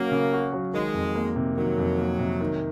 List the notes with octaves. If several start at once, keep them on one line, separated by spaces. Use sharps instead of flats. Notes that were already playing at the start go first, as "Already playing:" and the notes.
Already playing: C#3 F#3 A#3 C#4 F#4
C#3
F#4
F#3
D#3 G#3
F2
A#3
C3
D#3 F#3
F2
A#3
C3
D#3